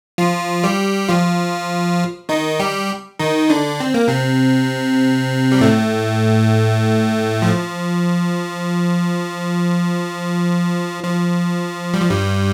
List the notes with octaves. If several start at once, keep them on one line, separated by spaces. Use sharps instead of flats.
F3 F4
G3 G4
F3 F4
D#3 D#4
G3 G4
D#3 D#4
D3 D4
C4
A#3
C3 C4
G3
A2 A3
F3
F3
G3
F3
G2 G3